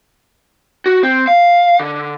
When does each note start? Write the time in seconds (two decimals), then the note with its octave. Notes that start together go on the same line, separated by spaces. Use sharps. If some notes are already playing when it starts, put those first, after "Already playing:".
0.86 F#4
1.03 C4
1.28 F5
1.80 D3